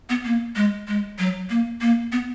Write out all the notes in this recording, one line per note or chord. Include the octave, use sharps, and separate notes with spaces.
B3
A#3
G#3
G#3
F#3
A#3
A#3
B3